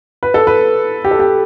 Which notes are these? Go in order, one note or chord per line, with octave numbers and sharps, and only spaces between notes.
B4
A4
B4
G4
A4
G4